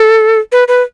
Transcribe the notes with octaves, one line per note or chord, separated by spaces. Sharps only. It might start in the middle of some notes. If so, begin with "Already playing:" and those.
Already playing: A4
B4
B4